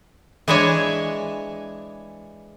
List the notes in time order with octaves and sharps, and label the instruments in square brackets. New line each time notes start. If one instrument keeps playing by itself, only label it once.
[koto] E3 G#3 D4 C#5 E5 G#5